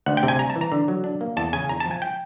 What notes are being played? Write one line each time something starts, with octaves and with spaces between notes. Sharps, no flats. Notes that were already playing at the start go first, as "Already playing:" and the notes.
D2 F#5
G5
C3
G#5
G3 A#5
A5
E3
A#5
D3
F#3
D4
A#3
E2 A5
C#3 G#5
E2 A#5
A5
F3
G#5
G5